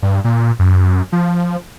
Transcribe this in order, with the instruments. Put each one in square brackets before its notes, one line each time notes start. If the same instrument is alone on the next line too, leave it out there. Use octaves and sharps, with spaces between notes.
[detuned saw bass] G2
A#2
F#2
F3